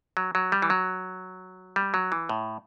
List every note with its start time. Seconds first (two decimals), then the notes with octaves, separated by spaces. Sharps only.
0.17 F#3
0.35 F#3
0.52 G3
0.62 E3
0.70 F#3
1.76 G3
1.94 F#3
2.12 E3
2.29 A2